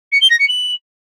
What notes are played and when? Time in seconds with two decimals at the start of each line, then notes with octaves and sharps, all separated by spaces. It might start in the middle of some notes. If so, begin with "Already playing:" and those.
0.12 C#7
0.21 G7
0.30 A#6
0.39 C#7
0.48 F#7